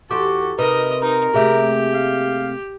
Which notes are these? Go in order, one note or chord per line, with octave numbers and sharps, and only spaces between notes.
E2 F#4 G4 A4 C5 D6
C3 D#4 A#4 B4 D#5
D#4 A#4
C3 A3 A#3 G4 G#4 E5
F5